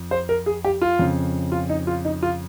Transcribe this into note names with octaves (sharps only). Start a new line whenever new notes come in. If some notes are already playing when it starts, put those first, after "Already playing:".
Already playing: F2
C5
A#4
G#4
G4
F4
F2 C#3
F4
D#4
F4
D#4
F4